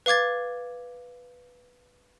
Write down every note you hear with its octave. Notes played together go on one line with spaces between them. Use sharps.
B4 F5 D6 G#6 A6